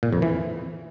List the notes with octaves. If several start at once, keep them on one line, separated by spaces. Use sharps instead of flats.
A#2
F2
E3